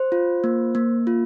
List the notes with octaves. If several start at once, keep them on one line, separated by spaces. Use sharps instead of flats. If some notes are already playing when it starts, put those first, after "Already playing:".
Already playing: C5
F4
A#3
A#3
F4